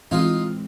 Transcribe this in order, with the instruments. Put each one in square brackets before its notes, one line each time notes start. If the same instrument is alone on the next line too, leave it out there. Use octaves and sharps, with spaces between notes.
[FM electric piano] A2 E3 G#3 C4 [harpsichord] D#4 F4